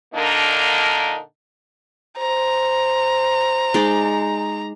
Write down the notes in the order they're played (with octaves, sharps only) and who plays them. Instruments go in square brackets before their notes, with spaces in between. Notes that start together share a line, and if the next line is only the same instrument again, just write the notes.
[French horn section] A#2 D3 A#3 D4 D#4 A#4
[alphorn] C5 [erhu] A#5
[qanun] G#3 D#4 D5